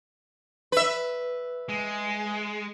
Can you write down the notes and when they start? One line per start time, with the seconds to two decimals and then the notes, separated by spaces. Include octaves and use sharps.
0.72 B4 E5
1.69 G#3